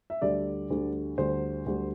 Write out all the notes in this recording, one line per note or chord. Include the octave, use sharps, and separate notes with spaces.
E5
D2 D3 G3 D5
D2 D3 G3
D2 D3 G3 C5
D2 D3 G3